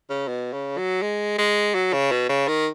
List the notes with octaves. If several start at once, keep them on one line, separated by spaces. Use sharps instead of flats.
C#3
B2
C#3
F#3
G#3
G#3
F#3
C#3
B2
C#3
D#3